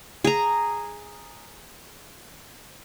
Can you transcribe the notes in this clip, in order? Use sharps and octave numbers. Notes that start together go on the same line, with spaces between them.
G#4 A#5